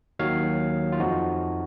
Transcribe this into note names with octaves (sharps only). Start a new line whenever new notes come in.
D#2 D#3 F#3 C#5 F5
F4
F2 F3 D#4 F#4